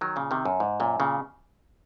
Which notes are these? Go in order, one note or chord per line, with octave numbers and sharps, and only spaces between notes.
D#3 F#3
A#2 C#3
C3 D#3
F#2
G#2
F#2 A#2
A#2 C#3